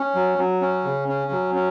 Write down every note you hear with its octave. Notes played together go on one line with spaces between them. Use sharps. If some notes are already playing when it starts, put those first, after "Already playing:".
Already playing: C#4
F#3
F#3
C#4
C#3
C#4
F#3
C#4